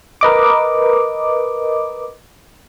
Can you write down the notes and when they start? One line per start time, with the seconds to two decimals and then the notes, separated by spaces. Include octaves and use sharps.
0.21 A#4 B4 D#5 D6